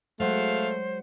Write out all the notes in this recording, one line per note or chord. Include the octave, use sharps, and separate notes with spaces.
F#3 G#3 A3 C5 F5 F#5